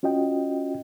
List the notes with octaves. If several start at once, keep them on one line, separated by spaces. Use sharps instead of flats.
C#4 F4 F#4 D#5 G5